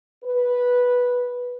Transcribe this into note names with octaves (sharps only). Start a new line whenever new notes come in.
B4